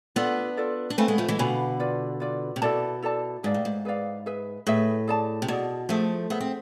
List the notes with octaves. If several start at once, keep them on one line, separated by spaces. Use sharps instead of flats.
B3 D4 F4 A4 D5
F4 A4 D5
D4
A3 C4 B4 F5 G#5 B5
G#3 B3
F3 A3
E3 G#3
B2 D3 B4 F5 G#5 B5
F4 B4 D5
F4 B4 D5
C3
B2 E4 A4 D5 A5
E4 A4 D5 A5
G#2 G#4 B4 D5 F5
A2
G#2
G#4 B4 D5 F5
G#4 B4 E5
A2 G#4 B4 E5
G#4 D5 A5
C3
B2 G#4 D5 A5
F3 A3 G#4 C5 E5
B3 G#4 C5 E5
C4